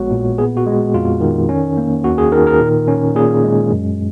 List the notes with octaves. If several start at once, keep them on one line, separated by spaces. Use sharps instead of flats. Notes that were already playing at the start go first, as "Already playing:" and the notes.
Already playing: A#1 G#3 B3 F#4 C#5
A#2
B3 G#4
F#4
G#3
F2 F4
D#3
C#4
A#3
D#2 F#4
G#4
D#3 A#4
A#4
A#2
C#4
A#2 G#4
G#3
F#2